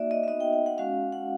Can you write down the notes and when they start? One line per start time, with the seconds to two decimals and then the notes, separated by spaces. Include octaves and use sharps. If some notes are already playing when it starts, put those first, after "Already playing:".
Already playing: A#3 D#4 F#4 D5 E5
0.11 D#5
0.23 E5
0.27 B3 D#4 F#4 D#5
0.40 G5
0.53 G5
0.66 F#5
0.78 G#3 C#4 F#4 F5
1.12 F#5